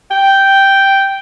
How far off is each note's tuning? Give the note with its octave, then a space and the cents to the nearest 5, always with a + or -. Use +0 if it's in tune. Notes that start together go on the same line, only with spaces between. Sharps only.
G5 -5